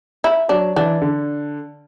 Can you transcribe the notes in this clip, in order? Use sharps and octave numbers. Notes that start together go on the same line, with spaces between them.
E4
F#3 D4
E3 D4
D3